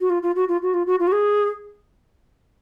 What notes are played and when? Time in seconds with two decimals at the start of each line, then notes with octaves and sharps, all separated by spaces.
0.01 F#4
0.10 F4
0.23 F4
0.36 F#4
0.49 F4
0.62 F#4
0.74 F4
0.87 F#4
1.00 F4
1.07 F#4
1.12 G#4